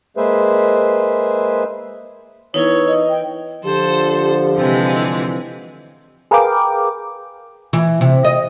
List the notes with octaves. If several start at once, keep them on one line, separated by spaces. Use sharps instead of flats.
G#3 A#3 G#4 B4 C5 E5
E3 B3 D#4 E4 A#4 C#5
D#5
G5
D3 F3 G4 A4 C5
C3 E3 G#3
G#4 A#4 B4 F5 G5 D6
E3
C3
D#5